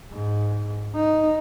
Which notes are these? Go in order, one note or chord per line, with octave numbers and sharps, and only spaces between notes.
G#2
D#4